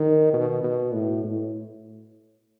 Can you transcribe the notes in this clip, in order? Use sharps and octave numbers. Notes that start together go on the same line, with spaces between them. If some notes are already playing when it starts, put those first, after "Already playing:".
Already playing: D#3
B2
B2
A2
A2